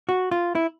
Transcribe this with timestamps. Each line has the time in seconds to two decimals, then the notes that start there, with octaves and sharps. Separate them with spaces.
0.09 F#4
0.31 F4
0.55 E4